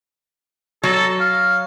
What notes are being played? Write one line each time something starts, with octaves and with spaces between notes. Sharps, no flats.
F#3 A4
F5